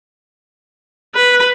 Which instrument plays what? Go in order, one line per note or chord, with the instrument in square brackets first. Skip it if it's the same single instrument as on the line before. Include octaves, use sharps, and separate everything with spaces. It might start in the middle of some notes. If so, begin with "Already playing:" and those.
[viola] B4